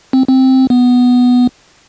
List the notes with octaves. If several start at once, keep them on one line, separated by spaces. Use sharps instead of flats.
C4
C4
B3